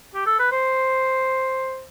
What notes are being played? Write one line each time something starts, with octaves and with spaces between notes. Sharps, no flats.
G4
A4
B4
C5